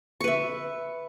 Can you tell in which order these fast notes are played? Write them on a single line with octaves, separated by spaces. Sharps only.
C#6 B4 E5